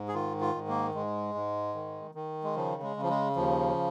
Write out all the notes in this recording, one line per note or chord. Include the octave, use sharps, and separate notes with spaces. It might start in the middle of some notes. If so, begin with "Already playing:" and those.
Already playing: G#2
G#4
D#3 F4
F4
G#2
A#3
G#2 G#3
G#2
D#3
D#3
G#3
C#3 F3
G#3
C#3
F3
G#3
D#2 F3